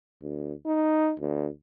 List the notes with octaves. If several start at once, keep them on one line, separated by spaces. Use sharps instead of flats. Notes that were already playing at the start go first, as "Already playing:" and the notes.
D2
D#4
D2